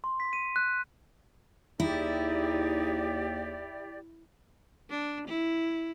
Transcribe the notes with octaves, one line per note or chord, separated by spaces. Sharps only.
C6
B6
D#7
F#6
D#2 D#4 E4 G4 G#4 D5
D4
E4